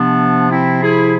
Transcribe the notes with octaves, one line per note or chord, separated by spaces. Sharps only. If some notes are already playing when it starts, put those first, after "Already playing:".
Already playing: C3 F3 B3 D4
C4 E4
E4 G#4